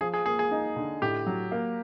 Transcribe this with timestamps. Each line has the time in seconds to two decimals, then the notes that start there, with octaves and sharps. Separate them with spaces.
0.01 F3 G#4
0.14 G#4
0.26 A#3 G#4
0.39 G#4
0.51 D#4
0.76 D3
1.02 A2 G4
1.26 F#3
1.52 A#3